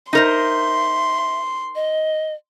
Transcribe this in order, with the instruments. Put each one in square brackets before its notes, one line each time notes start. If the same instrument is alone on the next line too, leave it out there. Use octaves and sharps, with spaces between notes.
[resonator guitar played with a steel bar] D#4 A#4 C5 [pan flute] E5 [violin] C6
[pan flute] D#5